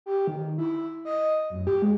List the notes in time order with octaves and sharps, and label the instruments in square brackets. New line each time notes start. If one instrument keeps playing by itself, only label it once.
[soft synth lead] G4
D#3
E4
D#5
F#2
G4
G#3